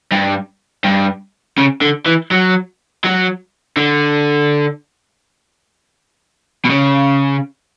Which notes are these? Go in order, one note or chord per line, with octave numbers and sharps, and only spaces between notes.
G2
G2
C#3
D3
E3
F#3
F#3
D3
B2
C#3